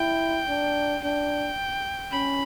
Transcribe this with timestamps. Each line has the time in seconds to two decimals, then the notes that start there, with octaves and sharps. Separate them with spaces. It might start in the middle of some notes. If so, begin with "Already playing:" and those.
Already playing: E4 G5
0.48 D4
1.03 D4 G5
2.12 C#4 B5